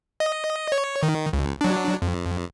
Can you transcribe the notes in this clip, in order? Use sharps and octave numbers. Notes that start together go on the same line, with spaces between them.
D#5
C#5
D#3
C#2
F#3 D4
F2